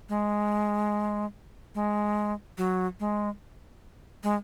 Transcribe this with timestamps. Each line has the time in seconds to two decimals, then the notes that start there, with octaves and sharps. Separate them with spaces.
0.09 G#3
1.75 G#3
2.57 F#3
3.00 G#3
4.23 G#3